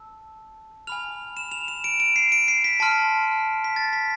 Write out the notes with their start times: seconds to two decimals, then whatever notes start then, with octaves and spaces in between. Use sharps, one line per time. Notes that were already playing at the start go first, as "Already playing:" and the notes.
Already playing: A5 E6
0.87 G#5 B5 F6 F7
1.37 E7
1.52 F7
1.68 E7
1.84 D7
2.00 D7
2.16 C7
2.32 D7
2.48 C7
2.64 B6
2.80 A5 C6 F6
3.64 B6
3.76 A6
3.93 B6